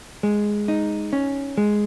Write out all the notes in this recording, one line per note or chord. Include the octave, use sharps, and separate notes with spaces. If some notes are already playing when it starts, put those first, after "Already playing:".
G#3
D#4
C#4
G#3